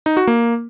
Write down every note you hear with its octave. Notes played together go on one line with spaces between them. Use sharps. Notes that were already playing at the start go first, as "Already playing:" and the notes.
D#4
F#4
A#3